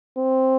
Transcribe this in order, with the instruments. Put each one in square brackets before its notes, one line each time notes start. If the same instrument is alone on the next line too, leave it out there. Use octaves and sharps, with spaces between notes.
[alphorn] C4